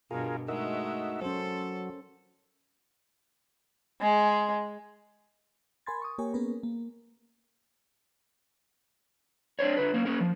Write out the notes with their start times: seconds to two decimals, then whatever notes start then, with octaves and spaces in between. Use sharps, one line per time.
0.11 G2 B2 F4 G#4 A#4
0.48 G#3 A3 D#4 F#4 A#4 E5
1.21 F#3 C#4 A4 C5
4.01 G#3
5.86 A#4 G#5 B5 C6 G#6 A6
6.02 C#6 D#6
6.18 A#3 G4 A#4 C#5 G#5
6.34 A#3 B3 C#4 G#4 A#4 B4
6.63 A#3
9.59 D4 C5 C#5
9.77 D3 B4
9.94 A#3 C#4
10.05 A#3 C#4 A#4
10.20 F3